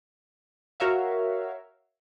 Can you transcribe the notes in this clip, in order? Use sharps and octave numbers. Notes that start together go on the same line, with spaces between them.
F#4 A#4 C#5 E5 F5